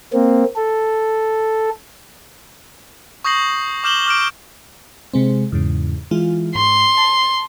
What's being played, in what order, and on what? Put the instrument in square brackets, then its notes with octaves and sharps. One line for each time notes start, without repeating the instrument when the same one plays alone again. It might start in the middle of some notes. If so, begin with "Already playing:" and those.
[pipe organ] A#3 C4
A4
[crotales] C#6 D#6 G6 A#6 C7 F#7
D6 F6 G6 E7 F#7 G7
D6 F6 G6 D7
[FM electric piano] C3 G#3 C4
E2 G#2 C#3
E3 G#3 F4
[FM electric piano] G#2 C#6 [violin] C6
[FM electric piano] A5